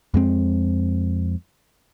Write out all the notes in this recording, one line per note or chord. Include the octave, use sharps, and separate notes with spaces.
F2 G#3 C4